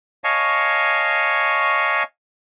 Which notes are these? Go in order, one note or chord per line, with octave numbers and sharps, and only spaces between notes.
C#5 D#5 F5 G#5 A5 C#6